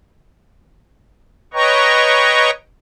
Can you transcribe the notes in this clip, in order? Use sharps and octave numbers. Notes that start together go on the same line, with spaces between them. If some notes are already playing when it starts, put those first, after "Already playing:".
B4 C#5 D#5 G5 A#5 C#6